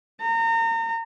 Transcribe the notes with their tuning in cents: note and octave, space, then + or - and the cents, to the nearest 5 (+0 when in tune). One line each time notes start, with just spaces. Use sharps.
A#5 -35